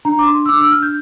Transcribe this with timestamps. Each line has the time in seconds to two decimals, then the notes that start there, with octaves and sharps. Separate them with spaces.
0.05 D4 A#5
0.19 D6
0.27 D4 C6
0.46 E6
0.49 D4 D6
0.61 E6
0.72 D4 F6
0.82 G6